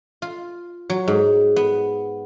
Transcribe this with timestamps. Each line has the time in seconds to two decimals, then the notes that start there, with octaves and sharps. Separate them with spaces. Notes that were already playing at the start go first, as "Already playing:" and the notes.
0.22 F4
0.90 F#3
1.08 G#2
1.56 B3